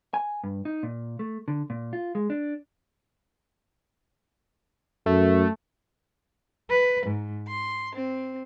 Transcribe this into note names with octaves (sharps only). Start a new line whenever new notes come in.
G#5
G2
D#4
A#2
A3
D3
A#2
F4
G#3
D4
F#2 A3
B4
G#2
C6
C4